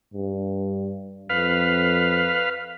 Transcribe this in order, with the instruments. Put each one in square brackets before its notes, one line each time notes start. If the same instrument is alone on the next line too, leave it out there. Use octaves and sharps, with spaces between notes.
[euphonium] G2
[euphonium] F2 [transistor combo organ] B4 F5